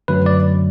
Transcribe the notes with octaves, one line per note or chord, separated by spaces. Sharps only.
F#2 D3 F#3 A3 B4
D5